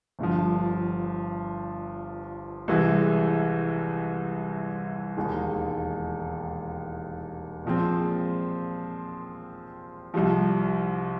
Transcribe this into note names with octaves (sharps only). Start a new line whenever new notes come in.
G1 G2 D3 F3
C2 C3 E3 G#3
E1 D#2 D#3 G#3
A#2 F3 G#3 C4
C2 C3 F3